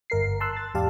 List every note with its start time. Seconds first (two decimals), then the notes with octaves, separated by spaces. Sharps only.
0.10 G1 A#4 C7
0.40 A5 C6 E6 F#6
0.56 A6
0.74 E2 G#2 G4 D5 F5 A5